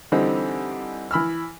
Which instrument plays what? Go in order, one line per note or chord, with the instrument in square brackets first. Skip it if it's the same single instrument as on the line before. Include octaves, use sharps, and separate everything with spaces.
[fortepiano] D3 E3 G3 C4 D#4
E3 B5 E6 F6